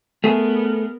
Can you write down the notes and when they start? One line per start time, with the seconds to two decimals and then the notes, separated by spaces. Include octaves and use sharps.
0.24 A3 B3 G#4 A#4